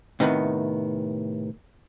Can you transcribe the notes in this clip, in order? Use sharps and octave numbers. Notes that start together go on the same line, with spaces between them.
A2 C3 D#3 B3